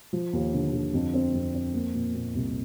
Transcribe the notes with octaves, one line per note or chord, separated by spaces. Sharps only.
F3
D#2
D3
D3
F2
C4
F2
C4
A#3
A#2
A#2
C2